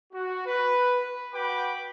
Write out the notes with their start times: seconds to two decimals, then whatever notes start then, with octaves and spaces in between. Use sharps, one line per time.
0.13 F#4
0.46 B4
1.33 F#4 B4 G5 B5 D6